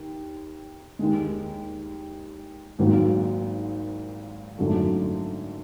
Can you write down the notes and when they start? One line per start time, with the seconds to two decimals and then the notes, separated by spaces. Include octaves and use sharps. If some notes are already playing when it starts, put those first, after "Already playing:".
Already playing: D#2
0.99 D#2 D#3 G#3
2.79 G#1 G#2 D#3 F#3 A#3
4.58 G#1 F#2 D3 F#3 A3